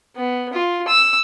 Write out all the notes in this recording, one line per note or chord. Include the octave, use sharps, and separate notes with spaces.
B3
F4
E6